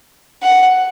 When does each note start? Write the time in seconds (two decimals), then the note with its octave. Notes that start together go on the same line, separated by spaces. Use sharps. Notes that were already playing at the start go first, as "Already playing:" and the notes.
0.43 F#5